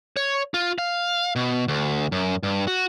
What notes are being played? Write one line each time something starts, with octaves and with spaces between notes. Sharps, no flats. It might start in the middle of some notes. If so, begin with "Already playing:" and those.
C#5
F4
F5
B2
D2
F#2
G2
F#4